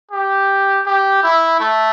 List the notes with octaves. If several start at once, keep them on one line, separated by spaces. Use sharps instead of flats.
G4
G4
E4
A3